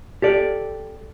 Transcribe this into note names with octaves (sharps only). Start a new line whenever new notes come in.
G4 A4 D5